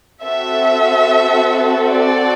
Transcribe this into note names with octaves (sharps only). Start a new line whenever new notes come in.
C4 F#4 A4 E5
D5